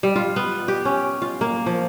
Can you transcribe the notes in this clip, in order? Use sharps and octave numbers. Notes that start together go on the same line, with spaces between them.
G3
F4
B3
G4
C#4
F4
A#3
F3